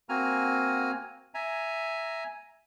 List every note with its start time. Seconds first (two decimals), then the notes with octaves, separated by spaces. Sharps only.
0.09 A#3 C4 F#4 G#5 A#5 F6
1.34 E5 G#5 A#5